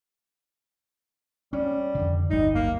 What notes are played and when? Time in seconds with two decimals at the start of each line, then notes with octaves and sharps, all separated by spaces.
1.53 G3 C#4
1.95 F2 D3
2.30 D1 G1 G3 D#4
2.55 A#3